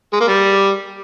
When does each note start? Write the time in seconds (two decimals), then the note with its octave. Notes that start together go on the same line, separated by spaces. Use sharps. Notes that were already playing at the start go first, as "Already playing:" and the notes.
0.13 G#3
0.20 A#3
0.28 G3